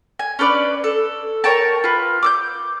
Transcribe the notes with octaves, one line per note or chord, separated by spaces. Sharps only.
G#5
C#4 D4 B4 D5
A4
A#4 C#5 G5 A5
F4 B4
D6 E6 G6